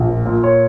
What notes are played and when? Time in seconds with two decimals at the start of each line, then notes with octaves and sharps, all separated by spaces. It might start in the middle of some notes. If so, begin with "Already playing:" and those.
Already playing: A#1
0.09 A#2
0.26 A#2
0.43 C#5